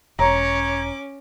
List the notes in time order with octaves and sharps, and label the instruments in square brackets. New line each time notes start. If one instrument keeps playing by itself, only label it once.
[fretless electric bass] E1 [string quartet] C#4 D6 [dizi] C#5 [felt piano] A#5